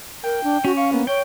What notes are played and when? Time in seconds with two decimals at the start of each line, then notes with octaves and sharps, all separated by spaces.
0.24 A#4 G5
0.44 D4
0.65 C#4 F#4
0.77 F5 C#6
0.93 A#3 B3
1.07 C#5 G5 D7